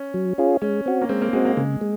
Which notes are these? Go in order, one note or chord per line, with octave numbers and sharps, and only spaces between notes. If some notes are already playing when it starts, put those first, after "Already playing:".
Already playing: C#4
F#3
C#4 F4 G#4
G#3 C#4
C4 F#4
A#3
G#3 C4
A#3
G#3 C4 F#4
A#3
C#3 G#3
G#3